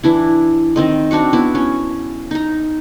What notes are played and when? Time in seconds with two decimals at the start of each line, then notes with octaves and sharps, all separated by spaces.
0.03 E3 D4 E4
0.76 D#3 C4 D#5
1.11 C4 D4 F#4 C#6
1.33 B3 E4 F#4
1.55 C#4
2.31 D#4 A#5